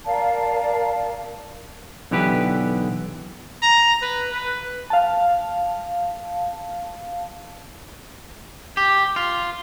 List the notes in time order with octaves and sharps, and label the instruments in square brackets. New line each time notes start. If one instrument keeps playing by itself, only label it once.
[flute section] A#4 D5 F5 A5
[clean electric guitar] B1 D3 E3 B3 G4 B4
[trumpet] A#5
B4
B4
[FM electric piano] F5 A5
[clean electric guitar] G4
F4